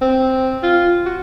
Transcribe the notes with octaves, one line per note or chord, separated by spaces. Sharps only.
C4
F4
F#4